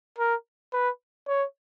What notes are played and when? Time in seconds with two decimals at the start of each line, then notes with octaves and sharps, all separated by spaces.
0.18 A#4
0.73 B4
1.28 C#5